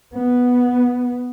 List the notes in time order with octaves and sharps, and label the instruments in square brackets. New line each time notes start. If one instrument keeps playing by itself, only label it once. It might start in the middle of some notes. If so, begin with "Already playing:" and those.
[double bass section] B3